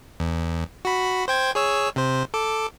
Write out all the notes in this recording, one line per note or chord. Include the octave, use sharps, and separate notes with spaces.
E2
F#4 B5
C5 G5 G#6
G#4 C#5 E6
C3 C5
A4 D6